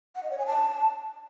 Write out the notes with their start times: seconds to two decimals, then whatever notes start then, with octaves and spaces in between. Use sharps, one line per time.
0.16 F#5
0.23 D#5
0.31 C#5
0.38 G#5
0.46 A5